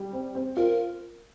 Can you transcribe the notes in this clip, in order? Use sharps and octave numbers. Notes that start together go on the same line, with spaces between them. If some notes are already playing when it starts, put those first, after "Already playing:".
Already playing: G3
C4
C4
F4 A#4